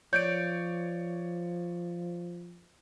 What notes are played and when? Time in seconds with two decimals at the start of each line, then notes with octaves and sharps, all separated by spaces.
0.13 F3 C#5 D5 G6 D7